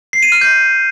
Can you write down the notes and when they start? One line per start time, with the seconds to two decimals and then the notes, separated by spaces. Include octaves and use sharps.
0.13 C7
0.23 D#7
0.32 F6
0.41 G6